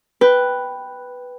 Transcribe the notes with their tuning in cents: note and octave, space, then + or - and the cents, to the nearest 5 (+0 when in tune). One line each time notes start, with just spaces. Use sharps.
B4 +0 G5 +0